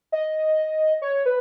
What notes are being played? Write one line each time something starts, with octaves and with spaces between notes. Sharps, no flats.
D#5
C#5
B4